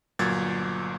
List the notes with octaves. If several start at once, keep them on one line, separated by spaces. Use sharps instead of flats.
G1 A#2 F#3 G#6 A6